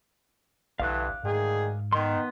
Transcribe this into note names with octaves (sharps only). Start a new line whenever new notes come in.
B1 G2 D3 E3 F5 D6 F#6
D2 G#2 D#3 G#4
D#3 B3 C6